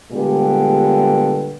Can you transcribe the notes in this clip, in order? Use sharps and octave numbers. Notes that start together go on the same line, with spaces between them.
A#2 D3 G3 G#3 B3 G4